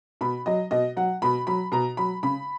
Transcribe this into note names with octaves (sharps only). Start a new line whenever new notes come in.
B2 B5
F#3 D#5
B2 D#5
F#3 F#5
B2 B5
F#3 B5
B2 A#5
F#3 B5
C#3 B5